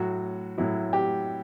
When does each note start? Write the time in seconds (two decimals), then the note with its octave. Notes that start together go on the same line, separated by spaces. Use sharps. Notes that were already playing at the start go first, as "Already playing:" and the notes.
Already playing: A2 F#3 F#4
0.58 A2 F#3 E4
0.93 G4